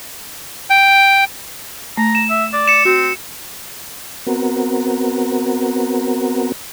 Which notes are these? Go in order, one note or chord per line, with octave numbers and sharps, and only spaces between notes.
G5
A3 A#5
E7
E5
D5
C#7 E7
C4 F#4
B3 C4 F#4 A#4